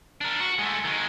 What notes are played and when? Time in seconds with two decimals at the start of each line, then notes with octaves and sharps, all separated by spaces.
0.21 D4 A#4
0.40 F#4
0.59 G#3 A3
0.85 D#3 G#3